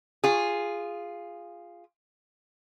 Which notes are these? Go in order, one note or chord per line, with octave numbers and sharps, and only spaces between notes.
F4 G#4